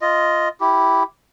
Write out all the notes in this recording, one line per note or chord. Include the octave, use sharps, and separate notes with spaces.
F4 D#5
E4 G4